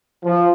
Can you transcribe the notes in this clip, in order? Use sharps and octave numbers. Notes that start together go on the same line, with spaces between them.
F3